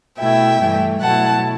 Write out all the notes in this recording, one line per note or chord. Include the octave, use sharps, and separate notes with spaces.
B2 A3 E4 E5 G5
G2 E3 A3
B2 F#3 A3 E4 F#5 A5